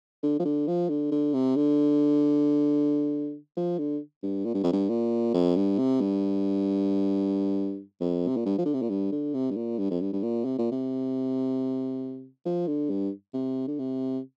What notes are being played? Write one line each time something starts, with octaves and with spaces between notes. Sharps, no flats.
D3
F3
D3
F3
D3
D3
C3
D3
F3
D3
G2
A#2
G2
F2
G2
A#2
F2
G2
C3
G2
F2
C3
A#2
G2
F3
D3
C3
A#2
G2
D3
C3
G2
A#2
G2
F2
G2
G2
A#2
C3
A#2
C3
F3
D3
G2
C3
D3
C3